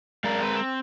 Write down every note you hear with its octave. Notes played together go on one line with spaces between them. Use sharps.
F#2 G#3 A#4 D5 F5
C4 B4
C4